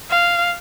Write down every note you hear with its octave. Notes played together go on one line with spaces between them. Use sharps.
F5